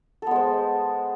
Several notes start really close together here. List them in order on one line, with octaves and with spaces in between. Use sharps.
A4 B3 G#3 C5